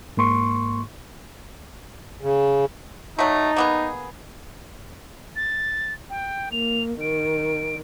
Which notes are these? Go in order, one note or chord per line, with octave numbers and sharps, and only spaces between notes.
G#2 A#3 C6 C#6
C#3
F#3 A3 D#4
A#3 B3 G#4
A6
G5
A#3 F7
D#3 D7